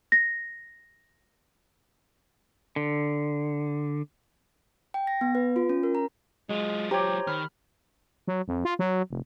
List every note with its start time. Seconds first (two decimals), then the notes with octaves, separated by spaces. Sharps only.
0.12 A#6
2.76 D3
4.94 G5
5.07 A#6
5.21 B3
5.35 B4
5.56 F4
5.69 C#4
5.83 A#4
5.95 A#5
6.50 F#3 G#3 F4
6.91 G4 C5 C#5 A#5
7.27 D#3 B5 F6
8.28 F#3
8.48 F2
8.65 F4
8.79 F#3
9.10 F1